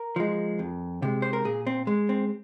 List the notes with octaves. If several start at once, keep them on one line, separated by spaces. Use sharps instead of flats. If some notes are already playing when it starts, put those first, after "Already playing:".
Already playing: A#4
F3 G#3
F2
C3 G#3
C5
A#4
A#2 G#4
C4
G#3
C4